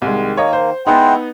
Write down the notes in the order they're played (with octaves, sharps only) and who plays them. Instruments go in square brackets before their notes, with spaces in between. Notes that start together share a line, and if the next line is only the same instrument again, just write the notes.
[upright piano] C2 G#3 [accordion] D#3
[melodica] A#3 [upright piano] C#5 D#5
[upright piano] C5
[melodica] G#3 E4 [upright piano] B3 D#4 [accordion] F#5 G5 C6